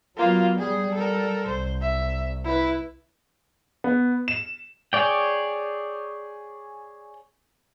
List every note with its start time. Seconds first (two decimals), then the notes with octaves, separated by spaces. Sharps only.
0.17 F#3 A#3 B3 F4
0.59 G3 G#4
0.94 A4 A#4
1.47 C2 C5
1.82 E5
2.45 E4 B4
3.84 B3
4.28 E7
4.93 G#4 C#5 D5 G5